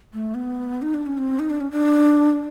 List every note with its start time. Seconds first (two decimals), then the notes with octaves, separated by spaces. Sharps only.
0.14 A3
0.34 B3
0.82 D#4
0.94 D4
1.06 C#4
1.18 C4
1.39 D#4
1.50 D4
1.61 C#4
1.71 D4